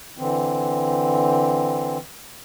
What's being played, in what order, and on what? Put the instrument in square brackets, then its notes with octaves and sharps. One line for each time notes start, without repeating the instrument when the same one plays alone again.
[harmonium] D3 E3 C4